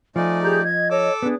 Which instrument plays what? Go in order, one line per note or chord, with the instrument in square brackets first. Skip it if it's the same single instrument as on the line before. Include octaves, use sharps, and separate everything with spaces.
[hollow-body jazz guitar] F3 [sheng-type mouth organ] A3 D#4 D5 [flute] G#5
[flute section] G4 G#4 G6 [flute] A#5
[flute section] D#5 [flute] G#6
[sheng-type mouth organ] A4 D6 E6 [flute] C#5
[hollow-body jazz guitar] B3 D4 [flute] G#4